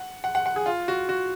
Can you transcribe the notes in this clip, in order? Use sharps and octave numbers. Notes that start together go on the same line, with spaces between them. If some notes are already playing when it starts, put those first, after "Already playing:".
Already playing: F#5
F#5
F#5
F#5
G#4
F4
F#4
F#4